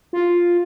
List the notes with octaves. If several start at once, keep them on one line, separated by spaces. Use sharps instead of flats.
F4